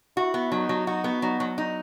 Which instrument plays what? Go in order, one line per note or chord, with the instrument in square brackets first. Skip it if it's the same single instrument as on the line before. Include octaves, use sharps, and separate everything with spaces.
[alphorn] E4 [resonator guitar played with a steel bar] F#4
[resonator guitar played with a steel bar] B3
[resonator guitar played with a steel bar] F#3 [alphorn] D#4
[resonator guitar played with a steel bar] F#3
[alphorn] D#4 [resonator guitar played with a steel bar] F#4
[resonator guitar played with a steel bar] B3
[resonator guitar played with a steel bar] F#3 [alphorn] D#4
[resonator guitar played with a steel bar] F#3
D#4